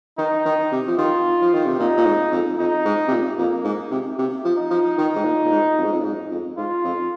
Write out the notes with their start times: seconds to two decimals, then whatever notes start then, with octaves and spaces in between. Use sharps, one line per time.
0.18 D#3 D#4
0.46 D#3
0.72 C3
0.87 F3
0.98 D#3 F4
1.42 F3
1.54 D#3
1.66 C3
1.79 A#2 D#4
1.97 A#2
2.06 G#2
2.32 F2
2.59 F2 D#4
2.85 G#2
3.08 C3
3.11 A#2
3.38 F2 A#3
3.64 G#2
3.91 C3
4.18 C3
4.44 F3
4.58 D#4
4.71 F3
4.98 D#3
5.16 G#2
5.24 A#2
5.44 A#2
5.51 G#2
5.78 F2
5.85 G#2
5.92 F2
6.00 A#2
6.04 G#2
6.31 F2
6.57 G#2 F4
6.84 F2